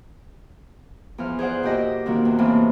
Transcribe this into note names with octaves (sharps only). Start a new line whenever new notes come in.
E2 F3 F6
G#4 C5 D5 F#5
A#2 F#4 G4 D#5 E6
C3 D#3 A#3 F#4
E2
A2 C3 E3 A#3